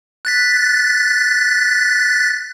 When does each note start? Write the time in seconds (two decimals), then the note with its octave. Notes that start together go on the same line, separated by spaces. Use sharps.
0.25 F#6 A6 B6